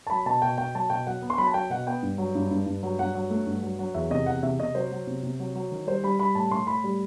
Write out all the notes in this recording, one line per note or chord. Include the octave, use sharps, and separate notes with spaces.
A5
F#3 B5
B2 A5
B2 G5
B2 G5
F#3 A5
B2 G5
F#3 F#5
B3
C6
F#3 B5
A5
F#3 G5
B2 F#5
B3 G5
G2
F#3
G2
G2
G2
F#3
G2 F#5
F#3
A3
G2
F#3
F#3
E2 E5
C3 D#5
E2 F#5
C3 E5
C3 D#5
F#3 C5
F#3
C3
C3
F#3
F#3
D#3
G3 C5
G3 B5
G3 B5
A2 A5
A2 C6
A2 B5
G3